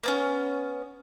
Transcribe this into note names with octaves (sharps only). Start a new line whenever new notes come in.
A#3 B3 C#4